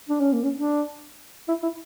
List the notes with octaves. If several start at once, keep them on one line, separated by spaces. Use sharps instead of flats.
D4
C#4
A#3
C#4
D4
E4
E4